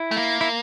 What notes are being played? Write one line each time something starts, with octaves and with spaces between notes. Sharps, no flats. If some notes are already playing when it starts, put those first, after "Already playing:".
Already playing: E4
A3
A#3
E4